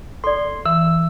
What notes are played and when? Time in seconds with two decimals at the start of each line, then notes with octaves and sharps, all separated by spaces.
0.24 A4 D5 C6
0.66 E3 E6